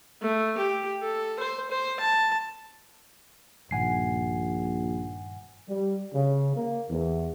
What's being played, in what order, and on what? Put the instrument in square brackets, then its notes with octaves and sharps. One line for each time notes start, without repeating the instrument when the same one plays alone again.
[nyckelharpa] A3
G4
A4
C5
C5
A5
[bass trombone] A#1 [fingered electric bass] G2 A#2 D#3 [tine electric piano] F#5 G#5 C7
[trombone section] G3
C#3
A#3
E2